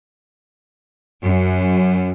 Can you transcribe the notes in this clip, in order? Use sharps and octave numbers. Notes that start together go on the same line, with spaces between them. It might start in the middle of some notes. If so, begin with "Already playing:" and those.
F#2